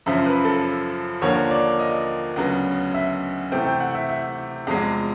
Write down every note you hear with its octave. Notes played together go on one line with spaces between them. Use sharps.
F#2 C#3 F3 E5
B4
A4
D#2 D3 F3 A#3 C#5
D5
D#5
D2 C#3 F#3 B3
E5
C3 E3 A3 C4 G5
G5
F#5
E5
E5
E2 C3 F3 G#3